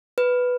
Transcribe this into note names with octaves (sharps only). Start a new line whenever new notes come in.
B4